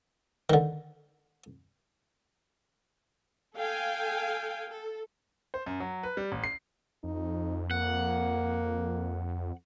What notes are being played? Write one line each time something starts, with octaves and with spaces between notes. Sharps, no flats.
D3 D#3
A4 F5 G5 G#5
A4
C5
F#2
F#3
B4
G3
A1
C7
F2 D#4
A#3 F#5